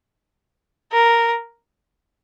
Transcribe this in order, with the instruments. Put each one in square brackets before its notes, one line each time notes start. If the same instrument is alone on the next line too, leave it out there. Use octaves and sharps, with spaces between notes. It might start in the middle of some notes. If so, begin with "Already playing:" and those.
[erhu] A#4